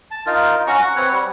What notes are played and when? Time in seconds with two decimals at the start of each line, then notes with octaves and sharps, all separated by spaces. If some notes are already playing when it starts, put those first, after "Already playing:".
0.11 A5
0.26 D#4 F4 A#4
0.67 C#4 F#4 A#5 C#6
0.81 F#5
0.96 C4 B4 C#5 F#5
1.11 G3